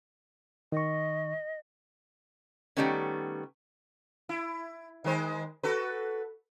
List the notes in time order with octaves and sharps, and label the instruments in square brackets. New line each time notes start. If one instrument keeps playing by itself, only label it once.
[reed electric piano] D#3 C#6 [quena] D#5
[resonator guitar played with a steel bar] D#3 F#3 G3 A3 B3 C#4
[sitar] E4
D#3 G#3 C5
F#4 A4 B4